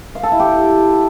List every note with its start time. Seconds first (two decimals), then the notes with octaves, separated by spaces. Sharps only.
0.15 F5
0.23 A4
0.31 E4
0.40 G4